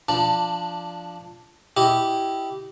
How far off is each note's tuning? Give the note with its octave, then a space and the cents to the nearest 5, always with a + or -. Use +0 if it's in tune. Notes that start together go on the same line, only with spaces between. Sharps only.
F3 -10 D4 +0 A5 +20
E4 +0 G4 -15 D#5 +0